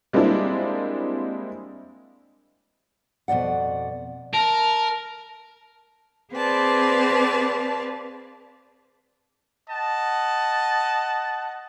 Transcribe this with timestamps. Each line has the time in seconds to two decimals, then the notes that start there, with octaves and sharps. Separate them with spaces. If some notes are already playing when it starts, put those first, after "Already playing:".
0.13 G3 G#3 A#3 C4 D4 E4
3.28 F2 B2 D#3 D5 F#5
4.33 A#4 A5
6.34 C4 G#4 B4 D5 F5 A5
9.68 D#5 F#5 A5